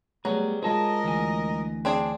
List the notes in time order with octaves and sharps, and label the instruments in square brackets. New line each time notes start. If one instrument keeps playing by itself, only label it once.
[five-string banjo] F#3 [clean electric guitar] G3 B3 G#4 [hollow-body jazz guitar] A3 A#5
[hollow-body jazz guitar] G#3 F4 C5 [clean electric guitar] G#4 A5 [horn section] A#4 D#5
[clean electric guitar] D2 E3 G#5
[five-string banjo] C4 D4 G#4